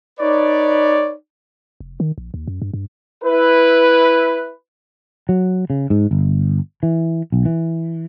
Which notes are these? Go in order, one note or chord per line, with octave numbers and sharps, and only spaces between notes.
D#4 B4 C#5 D5
F1
D#3
A#1
D#2
F#2
G2
G2
E4 B4
F#3
C#3
G#2
G1
E3
B1
E3